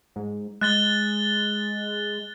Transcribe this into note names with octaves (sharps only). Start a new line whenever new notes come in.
G#2
G#3 F#6 A6 G7